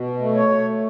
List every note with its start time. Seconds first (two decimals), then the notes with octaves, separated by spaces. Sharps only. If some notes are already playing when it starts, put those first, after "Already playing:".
Already playing: B2
0.20 A3
0.35 C#5
0.50 A3